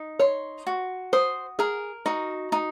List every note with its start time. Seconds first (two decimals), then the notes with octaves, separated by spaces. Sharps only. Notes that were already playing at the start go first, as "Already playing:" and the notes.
Already playing: D#4
0.19 C#5 C6
0.67 F#4
1.13 C5 D#6
1.59 G#4 A#4
2.06 D#4 F#4
2.52 D#4